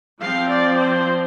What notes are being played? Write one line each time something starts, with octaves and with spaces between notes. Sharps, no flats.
F3 C4 F5
D5
C5